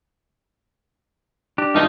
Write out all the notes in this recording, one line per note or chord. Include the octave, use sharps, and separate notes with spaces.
D4 G4
G#1 G2 F3 D#4